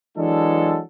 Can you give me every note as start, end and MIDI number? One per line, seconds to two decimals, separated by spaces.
0.18 0.81 52
0.18 0.81 54
0.18 0.81 56
0.18 0.81 62
0.18 0.81 69